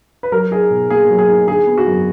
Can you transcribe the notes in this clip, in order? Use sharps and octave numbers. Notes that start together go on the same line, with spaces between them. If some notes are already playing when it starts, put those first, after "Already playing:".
B4
F#3 A#4
D#4 G#4
B2
A#3 G#4
F#3
G#4
D#4
D3 G#4
B3
F#4
F#2